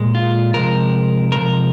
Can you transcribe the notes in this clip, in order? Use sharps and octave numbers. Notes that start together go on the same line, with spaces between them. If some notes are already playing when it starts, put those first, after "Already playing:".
Already playing: A#2 G#3
F4
C3 F3 G#3 A#4
C3 F3 G#3 A#4